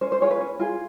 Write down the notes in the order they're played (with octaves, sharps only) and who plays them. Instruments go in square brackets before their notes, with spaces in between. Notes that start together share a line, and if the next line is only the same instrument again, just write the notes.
[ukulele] C#4 C5
C5
F4 G#4 C#5
B4
C#4
F4 G#4